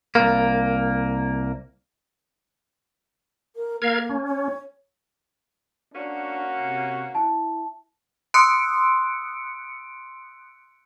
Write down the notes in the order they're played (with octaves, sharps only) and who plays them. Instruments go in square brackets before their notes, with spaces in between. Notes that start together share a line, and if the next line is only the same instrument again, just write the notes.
[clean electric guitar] C2 A#3
[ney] A#4
[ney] A#3 [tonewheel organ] A#4 F5 G#6
[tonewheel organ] C#4
[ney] C#5
[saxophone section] A#3 C#4 F#4 [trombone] D4
[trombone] C3
[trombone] E4 [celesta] A5
[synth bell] C6 D#6 E6 F#6 C#7 D7